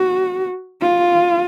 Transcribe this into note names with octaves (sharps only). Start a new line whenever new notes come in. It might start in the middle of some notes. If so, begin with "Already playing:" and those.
Already playing: F#4
F4